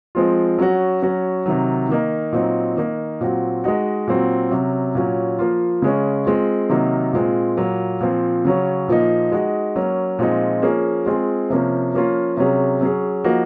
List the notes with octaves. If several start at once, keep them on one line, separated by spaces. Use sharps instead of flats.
F3 G#3 C4 F4
F#3 C#4 F#4
F#3 C#4 F#4
C3 D#3 F#3
D#3 A#3 D#4
A#2 F#3 C4 D#4
D#3 A#3 D#4
A#2 F#3 C4 F#4
G#3 D#4 F#4
A#2 F#3 C4 F#4
C3 F#3 C#4
A#2 F#3 C#4
F3 A#3 F4
C#3 G#3 C#4
G#3 C4 F4 G#4
C3 D#3 F#3 A#3 D#4
A#2 G#3 C4 F4
A#2 F#3 A#3
A#2 F3 C4
C#3 F#3 C#4
A#2 F3 A#3 D#4
G#3 D#4 F#4
F#3 A#3 C#4
A#2 F3 G#3 C4 D#4
F3 A#3 C#4 G#4
G#3 C4 F4 G#4
C3 F3 A#3 C#4
F3 A#3 C#4 F4
C3 F#3 C#4 G#4
F#3 C#4 G#4
F3 A#3 D#4 F#4